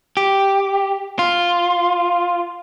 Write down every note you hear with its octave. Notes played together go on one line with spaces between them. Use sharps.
G4
F4